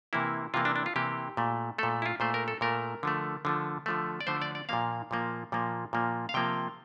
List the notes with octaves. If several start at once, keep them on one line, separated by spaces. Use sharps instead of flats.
C3 E3 A#3 E4
C3 E3 A#3 F4
D4
D4
F4
C3 E3 A#3 G4
A#2 A3
A#2 A3 A4
E4
F4
A#2 A3 C5
A#4
A4
A#2 A3 A#4
D3 F3 A3
D3 F3 A3
D3 F3 A3
D5
D3 F3 A3 C5
D5
D5
A#2 F3 A#3 F5
A#2 F3 A#3
A#2 F3 A#3
A#2 F3 A#3
F5
C3 F3 A#3 G5